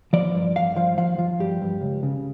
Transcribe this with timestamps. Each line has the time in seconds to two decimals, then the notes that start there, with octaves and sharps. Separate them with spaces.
0.13 F3 D5
0.34 G2
0.56 G2 F5
0.76 F3 F5
0.98 F3 F5
1.19 F3
1.39 G2 G4
1.61 G2
1.81 C#2
2.03 C#3